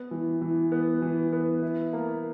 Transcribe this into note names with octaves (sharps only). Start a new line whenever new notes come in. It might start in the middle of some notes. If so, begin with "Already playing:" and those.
Already playing: B3
E3
E3
B3
E3
B3
E4
A#3